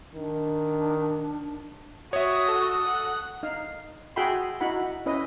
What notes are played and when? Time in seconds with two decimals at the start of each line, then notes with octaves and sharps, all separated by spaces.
0.15 D#3 D4
2.13 F#4 C#5 E5 D#6
2.48 A4
2.86 F#5
3.43 D#4 F5
4.16 F#4 G#4 E5 G5 B5 C6
4.60 D#4 E4 F#4 F#5 B5
5.06 C#4 E4 B4 D#5